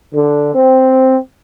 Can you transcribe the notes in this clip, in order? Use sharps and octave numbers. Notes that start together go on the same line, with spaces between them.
D3
C4